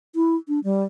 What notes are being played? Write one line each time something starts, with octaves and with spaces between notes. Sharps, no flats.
E4
D4
G3